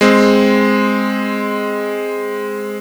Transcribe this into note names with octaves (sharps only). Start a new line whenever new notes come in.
G#3 C4